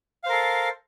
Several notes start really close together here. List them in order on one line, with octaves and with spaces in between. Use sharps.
F5 C5 A#4 A4